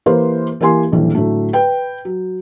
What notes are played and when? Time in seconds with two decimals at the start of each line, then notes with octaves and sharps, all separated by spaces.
0.06 E3 A#3 G4 B4 C5
0.61 E3 A#3 G4 G#5 C6
0.92 D#1 A#1 E3
1.14 A2 D3 F#3 A3
1.53 B4 G5
2.05 F#3